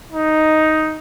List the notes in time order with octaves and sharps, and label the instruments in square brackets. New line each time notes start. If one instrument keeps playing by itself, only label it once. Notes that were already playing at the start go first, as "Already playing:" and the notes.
[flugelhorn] D#4